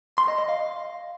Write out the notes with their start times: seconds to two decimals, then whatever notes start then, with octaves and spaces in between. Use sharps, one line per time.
0.18 C6
0.28 D#5
0.38 D#5
0.49 F5